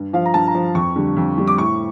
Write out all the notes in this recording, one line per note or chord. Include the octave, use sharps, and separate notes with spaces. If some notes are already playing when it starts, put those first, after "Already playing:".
Already playing: G2
F3 F5
A#5
G2 A5
A#5
F3
F2 C#6
D3 G3
F2
D3 G3
D6
A2 C#6